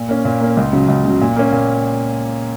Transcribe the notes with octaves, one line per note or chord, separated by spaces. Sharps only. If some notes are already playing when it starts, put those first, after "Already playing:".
Already playing: A#2
A#3 C#4
A#2
A#3 C#4
C#2
C#3 F#3
C#2
C#3 F#3
A#2
A#3 C#4
A#2